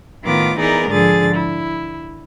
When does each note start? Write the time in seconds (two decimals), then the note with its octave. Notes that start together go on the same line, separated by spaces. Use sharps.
0.24 A2 D#3 B3 F4 D6
0.59 E3 B3 D#4 G#4 A#4 D5
0.90 G#2 D3 F3 G#4 A6
1.37 E4